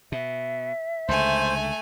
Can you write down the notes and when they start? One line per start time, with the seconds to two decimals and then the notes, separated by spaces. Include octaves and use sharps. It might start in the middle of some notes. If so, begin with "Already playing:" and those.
0.12 B2 E5
1.08 C#2 D3 A3 C5 G#5